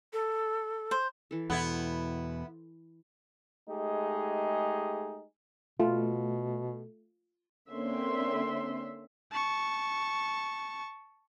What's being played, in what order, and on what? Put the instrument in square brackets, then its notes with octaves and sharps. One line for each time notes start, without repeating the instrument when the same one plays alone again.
[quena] A4
[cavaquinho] C5
[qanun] E3 A4
[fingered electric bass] E2 B2 [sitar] B3 E4 [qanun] A4 C5
[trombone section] G#3 A3 D#4 G4 G#4
[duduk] B2 [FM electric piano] A3 [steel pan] F4
[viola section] D3 A#3 C4 C#4 E5 C6
[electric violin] A5 C#6